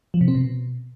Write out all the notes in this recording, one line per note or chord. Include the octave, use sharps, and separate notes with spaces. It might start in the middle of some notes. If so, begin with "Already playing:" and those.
F3
C3
C4
B2